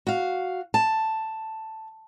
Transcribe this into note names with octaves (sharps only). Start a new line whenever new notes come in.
F#4 F5
A5